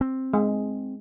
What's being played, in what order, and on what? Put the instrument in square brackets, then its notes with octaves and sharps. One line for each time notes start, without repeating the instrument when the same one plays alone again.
[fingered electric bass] C4
[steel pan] G#3